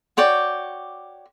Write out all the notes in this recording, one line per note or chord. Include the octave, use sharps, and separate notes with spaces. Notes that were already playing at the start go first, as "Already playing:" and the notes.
F#4 C#5 D5 G5